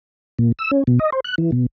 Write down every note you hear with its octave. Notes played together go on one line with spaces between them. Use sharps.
A#2
E6
C#4
B2
D#5
C5
F#6
E3
B2